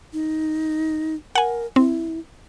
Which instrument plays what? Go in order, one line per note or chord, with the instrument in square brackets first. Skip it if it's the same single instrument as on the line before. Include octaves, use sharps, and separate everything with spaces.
[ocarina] D#4
[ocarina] A#4 [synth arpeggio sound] F#5 G#5
[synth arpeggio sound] C4 [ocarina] E4